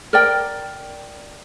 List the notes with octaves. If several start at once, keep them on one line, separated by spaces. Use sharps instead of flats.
A#4 D5 G5